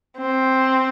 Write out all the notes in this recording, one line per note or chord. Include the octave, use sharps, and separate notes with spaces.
C4